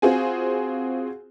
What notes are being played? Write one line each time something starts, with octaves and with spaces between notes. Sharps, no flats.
C4 F4 F#4 G#4 C5 G#5